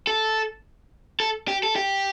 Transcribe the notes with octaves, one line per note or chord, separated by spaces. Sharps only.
A4
A4
G4
A4
G4